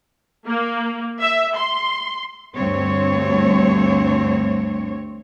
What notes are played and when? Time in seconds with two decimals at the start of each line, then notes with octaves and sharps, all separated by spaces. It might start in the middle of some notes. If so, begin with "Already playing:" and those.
0.46 A#3
1.21 E5
1.56 C6
2.53 D2 G2 C4 C#5